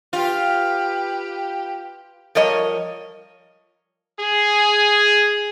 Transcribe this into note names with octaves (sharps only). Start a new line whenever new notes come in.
F4 G4 B4
F3 G3 A#4 C#5 D#5
G#4